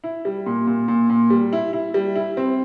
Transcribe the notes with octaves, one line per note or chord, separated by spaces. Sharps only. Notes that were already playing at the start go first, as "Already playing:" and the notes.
E4
G3
A#2
A#2
A#2
A#2
G3
E4
E4
G3
E4
C4